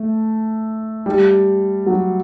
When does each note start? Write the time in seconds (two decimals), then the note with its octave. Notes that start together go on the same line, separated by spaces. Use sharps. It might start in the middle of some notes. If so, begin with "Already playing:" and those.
Already playing: A3
1.06 G3
1.86 F#3